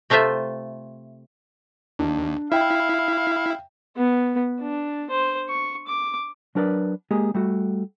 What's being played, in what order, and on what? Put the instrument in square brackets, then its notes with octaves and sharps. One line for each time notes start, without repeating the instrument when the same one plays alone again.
[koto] C3 A3 F4 C5 E5
[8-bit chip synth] D#2 [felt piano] D4
[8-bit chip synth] E4 [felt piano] E5 G5 [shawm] F5
[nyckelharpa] B3
D4
C5
C#6
D6
[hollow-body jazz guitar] F#3 D4 A#4 B4 D5
G#3 A#3 G4 G#4
G3 A3 F#4